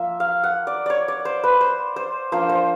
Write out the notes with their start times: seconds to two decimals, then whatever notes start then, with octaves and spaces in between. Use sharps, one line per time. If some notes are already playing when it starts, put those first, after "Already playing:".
Already playing: F3 A#3 E5
0.20 F5
0.44 F#5
0.67 D5
0.86 C#5 D5
1.08 D5
1.25 C5
1.44 B4
1.61 C5
1.96 C5
2.32 F3 A#3 D4 F4 C5
2.49 C5